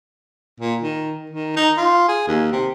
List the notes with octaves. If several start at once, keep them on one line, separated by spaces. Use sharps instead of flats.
A#2
D#3
D#3
D#4
F4
G#4
D#2
C3